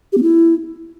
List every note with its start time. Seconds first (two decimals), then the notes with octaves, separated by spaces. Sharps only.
0.13 G4
0.18 B3
0.23 E4